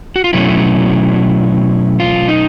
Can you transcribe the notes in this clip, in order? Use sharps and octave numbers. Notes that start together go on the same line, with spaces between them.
F#4
F4
B2 F#3 A3 C#4 E4
F4
D#4